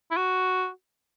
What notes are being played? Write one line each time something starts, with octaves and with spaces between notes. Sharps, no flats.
E4
F#4